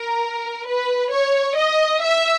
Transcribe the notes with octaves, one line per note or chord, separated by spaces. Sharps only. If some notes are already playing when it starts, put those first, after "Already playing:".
Already playing: A#4
B4
C#5
D#5
E5